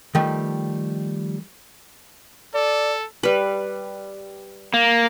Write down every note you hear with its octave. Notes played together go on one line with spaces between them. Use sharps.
D#3 F3 G3 A3
A4 D5
G3 B4
A#3